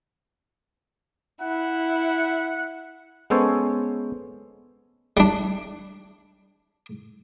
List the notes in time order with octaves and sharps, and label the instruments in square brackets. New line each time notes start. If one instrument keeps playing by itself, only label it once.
[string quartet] E4 [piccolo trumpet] F#5
[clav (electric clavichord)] G#3 B3 C#4 A4 C5 C#5
[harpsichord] G3 D4